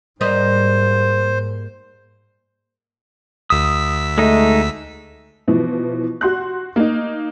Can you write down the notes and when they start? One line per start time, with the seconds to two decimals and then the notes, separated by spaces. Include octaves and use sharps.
0.21 G#2 G3 A#3 C5 D#5
3.50 D2 D#6 E6 B6
4.18 G#3 A3 D#4 D#5
5.48 B2 E3 F3
6.21 F#4 C6 F#6
6.76 A#3 D#4